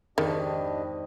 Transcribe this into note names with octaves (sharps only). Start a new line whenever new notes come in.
G#1 F2 D#3 D4 G4 D#5